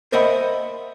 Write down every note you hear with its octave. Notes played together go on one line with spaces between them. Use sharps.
A#4 C5 D#5 E5 F#5 B5